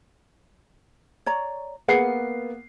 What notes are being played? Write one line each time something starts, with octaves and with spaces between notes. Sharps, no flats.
C#5 D5 A#5
A#3 B3 G#4 B4 F#5 C7